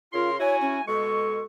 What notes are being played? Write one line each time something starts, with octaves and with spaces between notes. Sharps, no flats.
C#3 F4 A#4 C6
E4 F#4 C#5 G#5
C#4
B2 G#3 A4 C#6